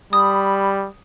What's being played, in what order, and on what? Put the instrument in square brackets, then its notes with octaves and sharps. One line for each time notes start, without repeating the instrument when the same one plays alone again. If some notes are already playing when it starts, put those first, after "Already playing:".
[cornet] G3 [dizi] B5 [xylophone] D#6